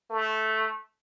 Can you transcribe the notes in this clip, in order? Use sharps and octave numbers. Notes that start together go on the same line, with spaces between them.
A3